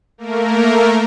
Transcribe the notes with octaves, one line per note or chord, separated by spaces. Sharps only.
A3 A#3 A#4